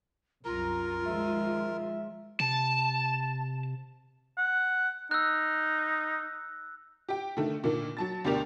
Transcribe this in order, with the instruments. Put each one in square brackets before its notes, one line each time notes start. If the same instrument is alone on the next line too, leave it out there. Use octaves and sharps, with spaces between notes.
[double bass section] C2 F#2 [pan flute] F4 [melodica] A#4 [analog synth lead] A#5
[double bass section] D#3 F3 G#3 [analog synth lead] E5
[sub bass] C3 [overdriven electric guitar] A5
[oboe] F#5
[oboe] D#4 [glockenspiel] E6 F#6
[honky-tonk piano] G4 G5
D3 D#3 A3
A#2 D3 D#3 A#3
F#3 A5 A6
D2 B2 D4 G4 A#4 F7